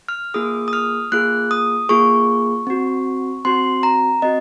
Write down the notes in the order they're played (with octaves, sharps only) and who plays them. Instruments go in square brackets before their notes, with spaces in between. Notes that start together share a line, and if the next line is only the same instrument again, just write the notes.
[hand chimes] F6
A#3 F4 G#4 D#6
D#6
F6
A#3 F4 G#4 F#6
D#6
A#3 F4 G#4 C#6
C4 F#4
C4 F#4 C6
A#5
C4 F#4 D#5